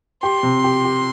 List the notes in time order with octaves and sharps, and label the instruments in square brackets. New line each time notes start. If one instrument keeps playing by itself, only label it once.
[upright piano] G4 [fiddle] C6
[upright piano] C3
G4
G4